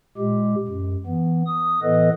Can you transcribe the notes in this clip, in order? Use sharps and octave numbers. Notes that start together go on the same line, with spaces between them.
A#2 G#3 G4
F#2
E3 B3
D#6
A2 E3 B3 A4 B4 D#5